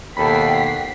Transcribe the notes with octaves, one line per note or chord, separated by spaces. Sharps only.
D#2 B2 A4 F#5 G5 B5 B6 C7